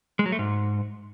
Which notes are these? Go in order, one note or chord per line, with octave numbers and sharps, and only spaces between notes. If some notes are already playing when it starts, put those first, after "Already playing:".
G#3
F#3
A3
G#2